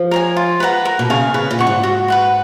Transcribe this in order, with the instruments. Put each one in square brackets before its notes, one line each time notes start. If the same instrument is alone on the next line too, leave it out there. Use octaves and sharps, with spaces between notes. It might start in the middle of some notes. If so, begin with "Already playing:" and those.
Already playing: [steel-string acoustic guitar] F3
[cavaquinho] A#4 C#5 G#5
F4
B4 F#5 A#5
A#4
[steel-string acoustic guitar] B2
[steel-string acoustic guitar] C#3 [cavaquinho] F5 G#5 C#6
[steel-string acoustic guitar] C#3 [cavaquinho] B4
[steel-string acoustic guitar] A#2
[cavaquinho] F#5 C#6
[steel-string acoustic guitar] G#2
[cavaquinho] F#4
B4 F#5 C#6